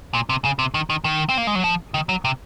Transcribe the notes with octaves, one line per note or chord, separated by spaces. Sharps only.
A#2
C3
C#3
C3
D#3
D#3
D#3
C4
A#3
G#3
F#3
F3
D#3
F#3
C3